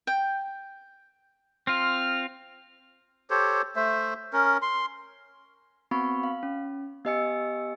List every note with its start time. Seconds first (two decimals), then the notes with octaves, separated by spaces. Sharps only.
0.07 G5
1.67 C4 F4 F6
3.30 G4 A4 C5 C#5
3.76 A3 C5 E5
4.33 C#4 A#4
4.62 C6
5.91 B3 C4 F#4 B5 C#6
6.23 F5
6.43 C#4
7.05 B3 G4 D#5 G#5 E6 C#7